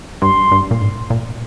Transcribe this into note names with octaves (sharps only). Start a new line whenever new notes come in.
G2 C6
G2
A#2
G#2
A#2